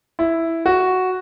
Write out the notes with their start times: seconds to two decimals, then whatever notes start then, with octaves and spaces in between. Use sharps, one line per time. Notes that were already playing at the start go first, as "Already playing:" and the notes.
0.19 E4
0.66 F#4